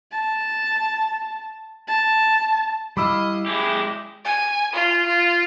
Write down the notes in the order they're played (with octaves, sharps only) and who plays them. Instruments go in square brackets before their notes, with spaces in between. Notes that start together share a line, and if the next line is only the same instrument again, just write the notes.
[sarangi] A5
A5
[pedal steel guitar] G3 E4 F5 [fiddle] D#5 [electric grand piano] B5 D6 E6
[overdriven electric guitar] G#3 G4 [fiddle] E4 [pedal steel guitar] G#4
[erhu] G#5
F4
F4